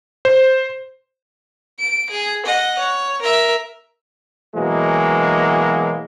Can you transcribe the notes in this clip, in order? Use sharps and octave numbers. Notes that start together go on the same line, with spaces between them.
C5
D7
G#4
D#5 F#5
C#5
A#4 E5
B2 E3 F#3 G#3 A#3